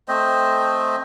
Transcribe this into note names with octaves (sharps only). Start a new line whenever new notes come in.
A3 C4 C5 D#5